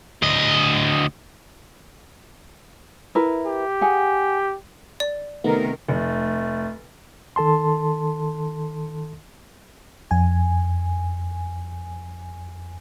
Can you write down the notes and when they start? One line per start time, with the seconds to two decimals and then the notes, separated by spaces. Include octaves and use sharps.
0.22 D2 D#5
3.15 E4 A#4 B4
3.47 G4
3.81 G#4 F#5 G#5
5.00 D5
5.44 C3 D#3 A3 B3 D#4 A#4
5.89 F1 A3
7.36 D#3 A4 A5 C6
10.11 F2 G#5